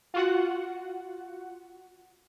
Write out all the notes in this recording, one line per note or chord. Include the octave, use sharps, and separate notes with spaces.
F4 F#4 F#5